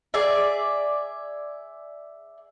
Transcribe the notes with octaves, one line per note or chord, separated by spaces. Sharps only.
G#4 D5 E5